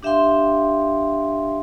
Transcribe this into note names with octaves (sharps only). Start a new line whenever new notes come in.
D4 G4 E5 F5 G5 C6